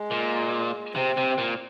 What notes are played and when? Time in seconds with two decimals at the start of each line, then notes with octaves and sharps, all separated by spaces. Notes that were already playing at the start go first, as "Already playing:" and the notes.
Already playing: G#3
0.11 A#2
0.95 C3 C4
1.17 C3
1.38 A#2